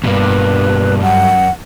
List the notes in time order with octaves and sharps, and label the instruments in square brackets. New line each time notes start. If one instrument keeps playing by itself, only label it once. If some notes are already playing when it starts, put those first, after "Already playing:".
[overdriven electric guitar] E2 G2 [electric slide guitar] B2 G3 A#3 [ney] B4
[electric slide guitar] F#2 [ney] F#5